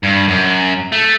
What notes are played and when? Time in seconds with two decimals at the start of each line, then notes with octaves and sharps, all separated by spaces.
0.04 G2
0.28 F#2
0.92 A3